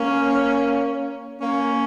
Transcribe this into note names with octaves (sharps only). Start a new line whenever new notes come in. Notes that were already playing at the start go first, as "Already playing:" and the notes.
Already playing: A#3 C#4
A#3 C#4